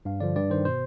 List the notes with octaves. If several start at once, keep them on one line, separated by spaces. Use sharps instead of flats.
G2 F5
D3 F3 D5
G2 D5
D#3 C5
B2 C5